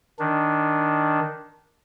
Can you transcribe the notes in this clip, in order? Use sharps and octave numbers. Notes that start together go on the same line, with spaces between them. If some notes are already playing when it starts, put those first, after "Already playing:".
D#3 D4